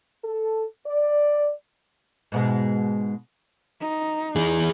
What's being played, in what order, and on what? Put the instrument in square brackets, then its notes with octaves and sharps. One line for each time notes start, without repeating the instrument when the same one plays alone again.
[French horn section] A4
D5
[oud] G#2 B2 G#3
[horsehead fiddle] D#4
[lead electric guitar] E3 G#4